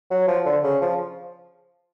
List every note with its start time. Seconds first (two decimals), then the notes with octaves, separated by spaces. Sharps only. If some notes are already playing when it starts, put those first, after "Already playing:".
0.11 F#3
0.27 F3
0.45 D3
0.63 C#3
0.81 F3